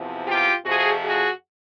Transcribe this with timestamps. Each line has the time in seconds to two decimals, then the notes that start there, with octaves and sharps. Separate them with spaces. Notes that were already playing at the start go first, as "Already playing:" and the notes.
Already playing: E2 C3 F3
0.26 F4 G4
0.64 F2 C3 F3 F#4 G#4
1.02 F#4 G#4